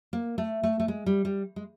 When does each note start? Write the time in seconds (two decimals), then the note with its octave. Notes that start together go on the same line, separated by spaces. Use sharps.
0.13 A#3
0.38 A3
0.63 A3
0.80 A3
0.88 G#3
1.06 G3
1.25 G3
1.56 G#3